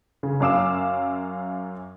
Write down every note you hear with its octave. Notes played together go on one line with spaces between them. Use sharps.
C#3
F#2 C#4 F5 D6 E6 E7